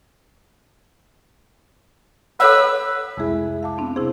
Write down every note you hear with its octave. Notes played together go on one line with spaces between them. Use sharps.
A4 B4 C#5 F#5 E6
C2 F2 G#3 E4 G#4
F5 A5 D6
B3 C4 D4
C3 E4 G#4 C5